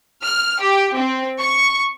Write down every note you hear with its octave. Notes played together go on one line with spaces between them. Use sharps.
F6
G4
C4
C#6